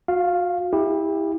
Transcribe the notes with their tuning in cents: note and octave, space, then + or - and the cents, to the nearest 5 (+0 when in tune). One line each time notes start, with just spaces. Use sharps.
F#4 -35 F5 +0
E4 -15 G4 +30